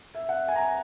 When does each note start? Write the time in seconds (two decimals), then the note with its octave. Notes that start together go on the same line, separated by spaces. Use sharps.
0.15 E5
0.29 F#5
0.48 G#5
0.56 A#5